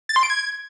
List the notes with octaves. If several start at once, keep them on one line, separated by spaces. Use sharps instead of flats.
A6
C6
D7
G#6